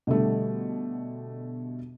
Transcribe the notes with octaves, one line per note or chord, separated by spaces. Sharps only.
B2 D3 G3 A3